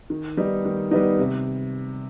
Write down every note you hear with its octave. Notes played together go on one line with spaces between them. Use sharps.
D#3
G3 B3 D#4
D#3
G3 B3 D#4
C3